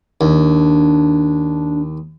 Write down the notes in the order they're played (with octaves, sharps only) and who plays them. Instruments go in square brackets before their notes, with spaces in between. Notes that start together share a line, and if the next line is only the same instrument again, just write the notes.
[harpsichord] D#2 [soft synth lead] D4